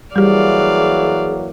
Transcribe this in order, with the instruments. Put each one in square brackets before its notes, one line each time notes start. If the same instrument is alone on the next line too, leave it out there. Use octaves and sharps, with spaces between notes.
[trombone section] E3 F#3 A#3 [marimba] G3 G4 [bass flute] G#4 [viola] D5 F5